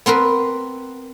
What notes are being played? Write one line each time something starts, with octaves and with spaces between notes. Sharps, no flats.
B3 C4 A#4 B4